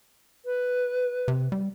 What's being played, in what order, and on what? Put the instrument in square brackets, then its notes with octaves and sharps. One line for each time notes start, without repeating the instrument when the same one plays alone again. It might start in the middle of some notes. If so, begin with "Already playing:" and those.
[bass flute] B4
[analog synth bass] C3
G3